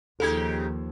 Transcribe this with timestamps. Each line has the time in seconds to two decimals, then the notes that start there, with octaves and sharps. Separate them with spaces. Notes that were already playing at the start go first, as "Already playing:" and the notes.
0.20 D#2 C#3 F3 D#4 G4 A4 G#6